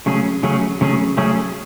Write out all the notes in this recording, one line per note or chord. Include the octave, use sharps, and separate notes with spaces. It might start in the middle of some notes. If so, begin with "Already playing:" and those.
C#3 F#3 A3 C#4 G#4
C#3 F#3 A3 C#4 G#4
C#3 F#3 A3 C#4 G#4
C#3 F#3 A3 C#4 G#4